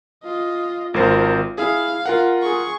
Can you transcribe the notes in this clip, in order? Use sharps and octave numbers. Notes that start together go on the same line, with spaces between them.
F4 D#5
G#1 F4 A#4 C5
E4 G#4 F5
F4 A#4 F#5
G#4 C#6